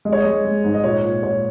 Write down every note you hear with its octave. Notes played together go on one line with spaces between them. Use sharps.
G#3 D#5
C#5
G#3 D#5
G#3
G#2
D#5
A#2 C#5
A#2
A#2 C#5